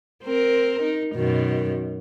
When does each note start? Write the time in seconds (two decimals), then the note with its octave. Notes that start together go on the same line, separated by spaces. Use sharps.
0.23 C4 A#4
0.82 D#4
1.15 F#2 B2 D#3